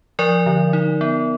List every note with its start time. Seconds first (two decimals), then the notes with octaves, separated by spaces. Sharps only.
0.19 F3 A#4 D5
0.46 D3
0.73 D#4
1.01 B3